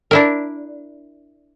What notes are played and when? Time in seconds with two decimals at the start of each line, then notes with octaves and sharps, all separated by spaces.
0.11 D4 E4 A#4